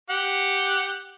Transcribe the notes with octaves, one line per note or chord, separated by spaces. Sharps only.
G4 F#5